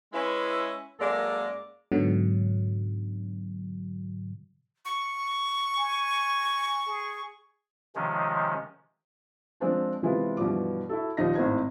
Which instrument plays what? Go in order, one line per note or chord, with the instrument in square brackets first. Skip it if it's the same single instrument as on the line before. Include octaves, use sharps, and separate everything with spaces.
[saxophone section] G#3 C#4 E4 B4 E5
F#2 G#3 A#3 A4 A#4 D5
[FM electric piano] G#2 B2 D3 F#3
[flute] C#6
[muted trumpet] G#5
G#4
[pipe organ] C3 D#3 F3 G#3 C#4
[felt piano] F3 G#3 C4 D4 F4
C3 E3 G#3 B3 F4
G2 B2 E3 F3 D5 D6
E4 F#4 A4
D#2 A#2 F3 D#4 A#6
G#1 A2 C4 D#4 B5 G#6